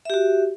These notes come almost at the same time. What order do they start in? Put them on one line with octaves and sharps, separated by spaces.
E5 G4 F#4